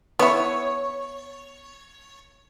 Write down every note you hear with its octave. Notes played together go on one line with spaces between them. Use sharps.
B3 E4 C#5